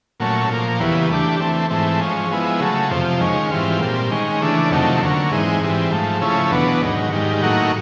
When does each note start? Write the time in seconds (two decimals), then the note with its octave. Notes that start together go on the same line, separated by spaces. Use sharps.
0.20 A#2 F#3 A3 C#4
0.50 A#2 F3 A#3
0.79 E2 C#3 E3 G3 B3
1.10 E3 A3 D4 G4
1.40 E3 A3 C4
1.70 G#2 E3 A3 C4
2.00 F3 G#3 C#4
2.30 F3 G#3 B3 E4
2.60 C#3 F#3 A3
2.91 F2 C3 F3
3.21 D#3 G#3 C#4
3.51 G#2 E3 G3 C4 F4
3.81 A#2 G3 C4
4.11 D#3 G#3 C#4
4.41 C#3 E3 A3 D4
4.71 F2 C3 D#3 F#3 A3
5.01 D3 F#3 A#3 C#4
5.31 G#2 E3 G#3 C4 D#4
5.61 G#2 E3 G3 C4
5.91 G#2 F3 A3
6.21 C#3 F3 A3 C#4 E4
6.51 E2 B2 F#3 B3 D4
6.81 G#2 D#3 F#3
7.12 G#2 D#3 G3
7.42 A2 F#3 A#3 D#4 F#4